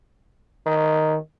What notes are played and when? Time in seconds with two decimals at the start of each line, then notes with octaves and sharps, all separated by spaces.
0.66 D#3